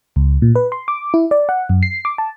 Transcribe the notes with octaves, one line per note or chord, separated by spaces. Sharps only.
C#2
A#2
B4
C6
D6
E4
D5
F#5
F#2
C7
D6
A5